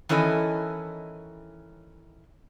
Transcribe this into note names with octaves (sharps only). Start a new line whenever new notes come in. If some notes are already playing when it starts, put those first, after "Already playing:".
D#3 E3 C#4 E4 A4 D#5